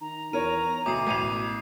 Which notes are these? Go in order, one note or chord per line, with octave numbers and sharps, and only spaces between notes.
D#3 A#5
E2 A#4 C#5 D#7
D2 B2 D6 D#6 C7
A1 D#7 F7